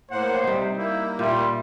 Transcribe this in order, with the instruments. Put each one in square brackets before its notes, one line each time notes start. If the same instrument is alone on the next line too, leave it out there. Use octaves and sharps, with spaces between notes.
[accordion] A2 A#3 F#5 [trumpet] C5
[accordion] C3 [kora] G3 D#4 [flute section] G5
[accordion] A#3 [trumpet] E4 [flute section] G6
[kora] A#2 [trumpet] G3 [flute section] D5 E5 C6